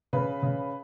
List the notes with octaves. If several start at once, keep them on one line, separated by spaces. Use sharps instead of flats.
C#3 B4
C#3